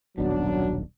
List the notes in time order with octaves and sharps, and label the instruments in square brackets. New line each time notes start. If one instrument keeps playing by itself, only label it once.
[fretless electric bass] D#1 B1 B2 [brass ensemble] F#2 F#3 [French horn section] D4